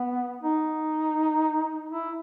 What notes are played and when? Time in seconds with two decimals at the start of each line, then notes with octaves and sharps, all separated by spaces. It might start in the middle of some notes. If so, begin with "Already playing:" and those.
Already playing: B3
0.43 D#4
1.90 E4